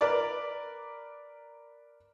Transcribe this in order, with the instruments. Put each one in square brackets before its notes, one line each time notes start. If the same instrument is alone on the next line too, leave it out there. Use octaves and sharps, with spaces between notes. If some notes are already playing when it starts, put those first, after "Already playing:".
[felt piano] A#4 B4 D5 D6